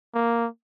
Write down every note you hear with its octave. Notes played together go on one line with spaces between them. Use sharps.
A#3